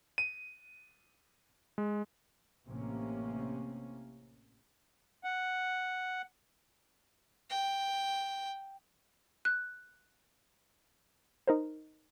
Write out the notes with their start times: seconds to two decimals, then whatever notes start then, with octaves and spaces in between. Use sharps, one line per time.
0.18 D#7
1.78 G#3
2.67 A1 C3 A#3 C#4
5.24 F#5
7.50 G5
9.45 F#6
11.47 D#4 A#4 C5